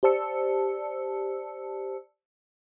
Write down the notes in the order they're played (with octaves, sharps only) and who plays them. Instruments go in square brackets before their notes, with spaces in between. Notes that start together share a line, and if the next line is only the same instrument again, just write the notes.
[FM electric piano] G4 C5 D5 A5 E6 C#7